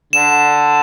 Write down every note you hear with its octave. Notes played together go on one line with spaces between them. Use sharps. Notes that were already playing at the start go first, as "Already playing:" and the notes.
D3 E7